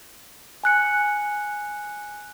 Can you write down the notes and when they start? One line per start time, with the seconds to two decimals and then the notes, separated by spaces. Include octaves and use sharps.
0.64 G#5 F#6 C#7